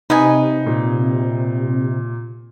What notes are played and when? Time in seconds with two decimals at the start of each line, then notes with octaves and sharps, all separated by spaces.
0.10 C3 D#4 B4 D#5 G#5
0.66 A#2